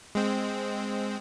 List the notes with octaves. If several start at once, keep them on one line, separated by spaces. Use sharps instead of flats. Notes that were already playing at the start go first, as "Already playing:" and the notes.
G#3 C4